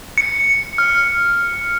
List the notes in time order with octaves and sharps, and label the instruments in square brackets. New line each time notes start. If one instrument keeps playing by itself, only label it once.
[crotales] C#7
F6